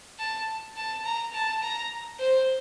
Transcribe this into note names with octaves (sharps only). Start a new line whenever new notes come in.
A5
A5
A#5
A5
A#5
C5